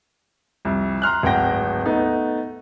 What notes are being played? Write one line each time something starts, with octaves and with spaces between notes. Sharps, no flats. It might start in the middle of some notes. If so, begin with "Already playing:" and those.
C2 F2
A#5 C6 F6 F#6
D1 G#1 F#5 G5 A#6
A3 B3 D#4